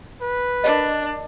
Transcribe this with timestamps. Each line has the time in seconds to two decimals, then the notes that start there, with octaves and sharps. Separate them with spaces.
0.21 B4
0.64 D4 A#4 D#5